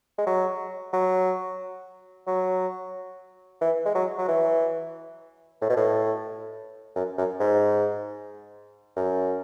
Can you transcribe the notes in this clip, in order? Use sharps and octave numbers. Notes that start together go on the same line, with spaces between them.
G#3
F#3
F#3
F#3
E3
G#3
F#3
F#3
E3
A2
B2
A2
F#2
F#2
G#2
F#2